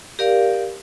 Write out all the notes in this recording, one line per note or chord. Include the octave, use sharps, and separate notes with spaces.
G4 A#4 D5 F5